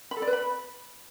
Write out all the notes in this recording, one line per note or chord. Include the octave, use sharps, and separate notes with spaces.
B5
A4
D5
B4
B5